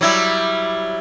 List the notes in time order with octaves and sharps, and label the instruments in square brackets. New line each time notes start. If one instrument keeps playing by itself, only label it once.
[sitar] F#3 G3 E4